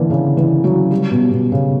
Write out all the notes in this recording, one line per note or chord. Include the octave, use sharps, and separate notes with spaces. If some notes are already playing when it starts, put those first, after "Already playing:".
Already playing: D3 E3 A#3
C#3
E3
F#3
G3
B2
B2
C#3